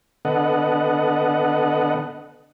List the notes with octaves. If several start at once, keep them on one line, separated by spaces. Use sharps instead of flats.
D3 B3 A4 D#5 F#5